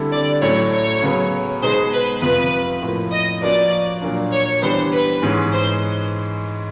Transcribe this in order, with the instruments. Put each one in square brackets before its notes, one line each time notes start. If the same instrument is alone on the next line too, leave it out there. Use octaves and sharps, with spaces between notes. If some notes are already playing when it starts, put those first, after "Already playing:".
Already playing: [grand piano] D3 G3 C4 E4 A4
[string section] D5
[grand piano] A2 F#3 A3 C#4 [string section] C#5
[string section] C#5
[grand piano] C#3 F#3 B3
[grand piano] B2 G#3 B3 D#4 G#4 [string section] C5
[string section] B4
[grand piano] F2 C3 F3 [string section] B4
[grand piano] A2 F3 A#3
[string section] D#5
[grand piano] F3 A#3 C#4 F#4 B4 [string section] D5
[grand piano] A#2 F#3 A#3 D4
[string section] C#5
[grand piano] E3 G3 B3 D4 [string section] C5
[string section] B4
[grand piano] G#2 E3 G#3 C#4
[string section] C5